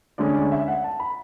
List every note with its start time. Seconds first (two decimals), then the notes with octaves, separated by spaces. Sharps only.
0.18 D2 D3 G#3 C#4 D5
0.34 D5
0.52 E5
0.68 F#5
0.84 A5
1.00 B5